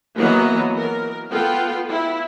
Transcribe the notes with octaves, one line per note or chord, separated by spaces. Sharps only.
E3 F#3 A#3 B3 D#5 A#5
A#4
B3 F4 A4 F5 G5
E4